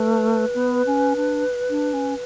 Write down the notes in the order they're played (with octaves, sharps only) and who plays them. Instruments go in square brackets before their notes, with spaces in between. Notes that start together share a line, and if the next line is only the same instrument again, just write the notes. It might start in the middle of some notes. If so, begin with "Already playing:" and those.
Already playing: [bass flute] A3 [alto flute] B4
[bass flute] B3
C#4
D4
D4
C#4